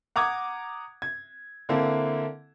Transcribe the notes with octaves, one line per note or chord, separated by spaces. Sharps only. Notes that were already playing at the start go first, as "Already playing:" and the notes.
F#5 A#5 D6 D#6 G#6
G#6
D3 A#3 C4 E4 A4